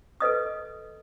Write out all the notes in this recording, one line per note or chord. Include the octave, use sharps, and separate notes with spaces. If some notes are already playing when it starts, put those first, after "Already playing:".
A4 B4 D#5 D#6